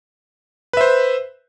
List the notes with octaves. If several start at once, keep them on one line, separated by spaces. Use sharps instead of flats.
B4 C5 E5